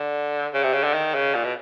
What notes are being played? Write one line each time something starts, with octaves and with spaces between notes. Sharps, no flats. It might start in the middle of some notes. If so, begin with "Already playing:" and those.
Already playing: D3
C#3
C3
C#3
D3
D#3
C#3
A#2
B2